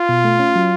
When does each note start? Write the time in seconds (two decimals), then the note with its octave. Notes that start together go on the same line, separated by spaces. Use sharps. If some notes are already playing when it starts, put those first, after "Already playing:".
Already playing: F4
0.09 B2
0.25 A3
0.39 C#4
0.55 F#3